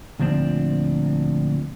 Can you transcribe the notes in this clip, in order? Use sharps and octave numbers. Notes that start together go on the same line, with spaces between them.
D2 A#2 F3 C4 D4